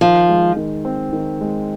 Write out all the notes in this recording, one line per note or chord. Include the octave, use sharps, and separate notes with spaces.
D#3 F3
G#3
D#3
C4
D#3
G#3